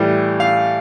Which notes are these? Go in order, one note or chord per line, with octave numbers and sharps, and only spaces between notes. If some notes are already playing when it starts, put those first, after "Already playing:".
Already playing: A2 E3 G3
F5